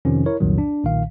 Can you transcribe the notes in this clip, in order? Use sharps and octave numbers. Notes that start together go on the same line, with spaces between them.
F2 C3 D#3 F3 C#4
E4 A#4 C#5
C2 F2 A#2 D#3 F#3
D4
B1 A#2 D#3 F5